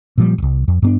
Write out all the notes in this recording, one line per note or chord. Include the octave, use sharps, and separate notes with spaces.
A#2 F3 G3
D1 C2
F2
G2 B3 D4